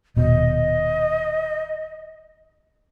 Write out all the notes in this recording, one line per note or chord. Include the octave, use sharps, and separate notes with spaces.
D#1 B2 D#5